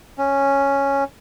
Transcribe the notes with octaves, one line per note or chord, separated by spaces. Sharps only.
C#4